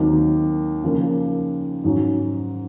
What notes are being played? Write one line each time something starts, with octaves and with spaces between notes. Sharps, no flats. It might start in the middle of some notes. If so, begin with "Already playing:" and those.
Already playing: D#2 D#3 F#3 C4 D#4
C#3 F3 A#3
G#2 F#3 C#4